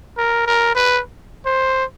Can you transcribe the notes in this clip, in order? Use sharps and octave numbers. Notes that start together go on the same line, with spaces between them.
A#4
A#4
B4
C5